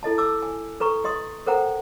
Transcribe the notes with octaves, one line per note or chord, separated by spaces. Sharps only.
E4 A4 D#5 A5
A4 A5 D6 E6
G#5
A4 B4 A#5 C#6
G4 D#5 C6 D#6
A4 A#4 C5 F#5 G5 A#5